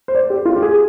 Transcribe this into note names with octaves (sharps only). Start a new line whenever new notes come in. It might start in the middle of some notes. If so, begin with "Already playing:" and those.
C5
D5
G4
F4
G4
G#4